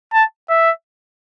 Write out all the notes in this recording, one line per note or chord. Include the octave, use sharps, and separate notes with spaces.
A5
E5